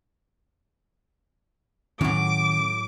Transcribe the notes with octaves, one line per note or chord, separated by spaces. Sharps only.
A2 D#3 F#3 C#4 D6